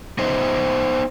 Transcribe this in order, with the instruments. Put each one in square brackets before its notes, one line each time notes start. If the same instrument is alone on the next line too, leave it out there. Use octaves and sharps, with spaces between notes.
[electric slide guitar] B3 D#4 C5 D#5 E5